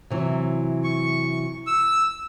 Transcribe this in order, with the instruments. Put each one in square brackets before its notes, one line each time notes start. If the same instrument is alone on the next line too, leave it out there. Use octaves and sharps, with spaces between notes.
[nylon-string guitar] C3 E3 F#3
[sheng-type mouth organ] C#6
E6